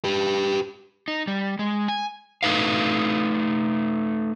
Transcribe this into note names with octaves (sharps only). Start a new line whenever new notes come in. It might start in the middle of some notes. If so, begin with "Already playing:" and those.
G4 B4
D#4
G3
G#3
G#5
A3 D#4 B4 F5